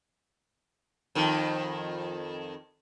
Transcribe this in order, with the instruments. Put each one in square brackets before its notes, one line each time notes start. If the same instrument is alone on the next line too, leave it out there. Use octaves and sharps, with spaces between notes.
[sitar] F2 D#3